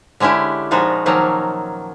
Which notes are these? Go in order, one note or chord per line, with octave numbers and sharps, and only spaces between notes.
D3 G#3 C#4 E4 G4
A#2 F3 G#3 D#4 F#4
D#3 F3 F#3 A#3 C#4